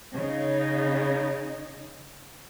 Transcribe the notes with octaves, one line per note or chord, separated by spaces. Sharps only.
C#3 D#4